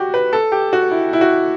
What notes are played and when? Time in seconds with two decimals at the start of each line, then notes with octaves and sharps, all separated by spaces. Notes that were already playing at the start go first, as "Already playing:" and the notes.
Already playing: F#4 G4
0.14 B4
0.33 A4
0.52 G4
0.73 F#4
0.91 E4
1.13 E4
1.21 F#4